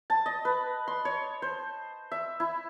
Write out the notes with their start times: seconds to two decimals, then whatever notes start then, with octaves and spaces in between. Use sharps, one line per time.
0.10 A5
0.26 D#5
0.45 B4
0.88 C6
1.05 C#5
1.42 C5
2.11 E5
2.40 E4